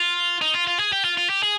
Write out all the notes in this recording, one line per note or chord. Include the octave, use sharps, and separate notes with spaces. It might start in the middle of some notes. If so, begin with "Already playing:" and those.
Already playing: F4
D#4
F4
F4
G#4
G4
F4
F4
G4
G#4